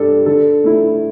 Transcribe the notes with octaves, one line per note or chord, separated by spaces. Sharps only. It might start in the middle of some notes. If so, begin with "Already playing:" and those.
Already playing: G2 G3 D4 A4
D3 A4
A3 E4